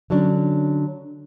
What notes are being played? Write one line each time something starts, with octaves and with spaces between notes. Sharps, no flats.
D3 F#3 C#4 D4